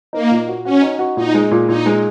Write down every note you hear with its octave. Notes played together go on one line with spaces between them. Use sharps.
A#3 D#4
A#2
F#4
C#4 F#4
D#4
F#4
A#2 D#4
G#3
A#2
A#2 D#4
G#3